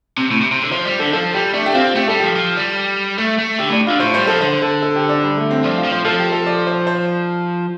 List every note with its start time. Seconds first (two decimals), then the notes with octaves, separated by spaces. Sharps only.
0.17 C3
0.31 A2
0.41 C3
0.52 C3
0.62 D3
0.72 F3 C5
0.86 G3 D5
0.99 D3 A4
1.13 F3 A4
1.34 G3 G4
1.54 A3 D4
1.66 G4
1.74 C4 F4
1.95 A3 G4
2.08 G3 A4
2.20 F3 G4
2.36 F3
2.57 G3
3.19 A3
3.39 A3
3.59 D3 G4
3.70 A2 D4
3.87 D3 F4
4.00 A2 C5
4.14 G3 C5
4.27 F3 A4
4.41 D3 C5
4.62 A4
4.83 A4
4.96 G4
5.09 D4
5.23 G3
5.37 A3
5.51 C4
5.64 F3 D4
5.78 F4
5.84 F3
5.92 C5
6.05 F3 A4
6.19 G4
6.32 A4
6.46 D5
6.67 C5
6.87 C5